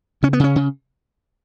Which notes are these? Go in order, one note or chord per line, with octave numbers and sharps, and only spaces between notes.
C#3 C#4
B3
C#3 C#4
C#3